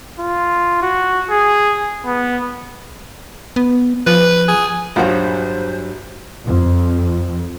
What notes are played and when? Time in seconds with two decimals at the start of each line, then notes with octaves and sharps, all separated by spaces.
0.20 F4
0.82 F#4
1.30 G#4
2.06 B3
3.56 B3
4.07 F3 B4
4.48 G#4
4.96 A#1 G2 F#3 F4 C5 F#5
6.45 F2